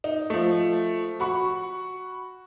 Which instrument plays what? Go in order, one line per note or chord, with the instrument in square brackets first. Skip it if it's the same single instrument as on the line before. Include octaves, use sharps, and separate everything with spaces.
[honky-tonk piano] D#4
F3 A3
F#4 B5 C#6